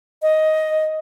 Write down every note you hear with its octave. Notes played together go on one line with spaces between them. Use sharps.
D#5